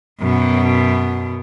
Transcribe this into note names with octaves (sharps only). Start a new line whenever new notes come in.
F#2 B2